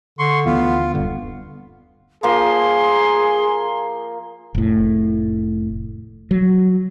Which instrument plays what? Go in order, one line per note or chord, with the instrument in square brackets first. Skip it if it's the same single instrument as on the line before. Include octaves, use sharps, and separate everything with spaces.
[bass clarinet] D3 [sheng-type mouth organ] C6 C#6
[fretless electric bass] D2 D3 E3 [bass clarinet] B3 [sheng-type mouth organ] F4
[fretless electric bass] D#1 G2 B3 [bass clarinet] D3
[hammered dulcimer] F3 A#3 [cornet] G#4 [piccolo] C6
[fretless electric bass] F1 A2
F#3